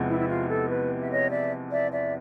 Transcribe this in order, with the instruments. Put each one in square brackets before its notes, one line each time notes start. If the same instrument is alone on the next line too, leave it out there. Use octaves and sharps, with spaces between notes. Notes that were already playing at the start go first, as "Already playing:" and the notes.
Already playing: [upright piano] E2 C3 F3 G#3 B3
[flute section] E4
E4
F4
A4
B4
E5
C#5 D#5
D5 E5
D5 E5
D5 E5